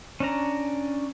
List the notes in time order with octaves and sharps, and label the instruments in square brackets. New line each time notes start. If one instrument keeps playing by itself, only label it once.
[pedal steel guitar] C#4 D4 A#5